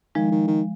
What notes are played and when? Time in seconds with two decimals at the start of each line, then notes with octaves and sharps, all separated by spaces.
0.15 D#3 F3 G#3
0.32 D#3
0.47 D#3